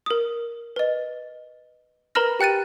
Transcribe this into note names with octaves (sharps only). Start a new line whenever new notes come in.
A#4 D#6
B4 D#5
A#4 B4 A#5 B5 F6 A#6
G4 G5 F#6 A6 D#7